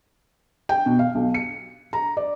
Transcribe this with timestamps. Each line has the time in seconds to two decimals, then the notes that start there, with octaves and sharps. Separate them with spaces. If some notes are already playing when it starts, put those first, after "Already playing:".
0.69 G5
0.86 B2
0.99 F5
1.15 B1
1.34 C#7
1.93 A#5
2.17 D5